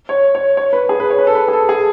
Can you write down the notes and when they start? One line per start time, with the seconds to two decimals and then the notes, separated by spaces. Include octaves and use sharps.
0.09 C#5
0.35 C#5
0.57 C#5
0.73 B4
0.89 G#4
1.00 B4
1.10 C#5
1.19 B4
1.27 A4
1.35 B4
1.48 G#4
1.53 A4
1.69 G#4